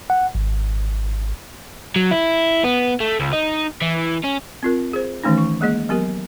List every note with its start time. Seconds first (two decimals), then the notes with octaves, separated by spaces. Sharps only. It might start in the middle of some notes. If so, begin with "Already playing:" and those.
0.10 F#5
0.35 G#1
1.96 F#3
2.11 E4
2.64 B3
3.01 A3
3.20 C#2
3.33 D#4
3.82 E3
4.24 C#4
4.63 C4 F4 A#4
4.93 G#4 C5
5.24 D#3 E3 A3 C#4 D#4
5.38 C#6
5.61 G#3 A#3 G#4 D#5
5.89 F#3 B3 G4 A#4